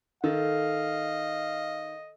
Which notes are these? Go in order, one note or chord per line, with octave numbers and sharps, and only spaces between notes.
D#3 A4 D#5 F5